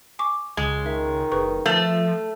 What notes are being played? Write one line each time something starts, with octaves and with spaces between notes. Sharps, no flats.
G#5 C#6 D6
C#2 G#3
D#3 E5
F#1 G#4 B4 C#6
F3 A3 A5 F6 A6